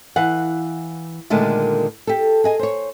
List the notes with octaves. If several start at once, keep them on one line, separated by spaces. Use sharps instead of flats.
E3 F5 F#5
A#2 D3 D#3 G#3 A3
G4 A4
G#4 D#5 G#5
C5 C#5